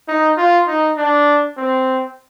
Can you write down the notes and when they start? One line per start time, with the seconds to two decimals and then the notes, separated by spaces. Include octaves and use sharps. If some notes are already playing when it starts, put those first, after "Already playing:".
0.08 D#4
0.37 F4
0.67 D#4
0.97 D4
1.57 C4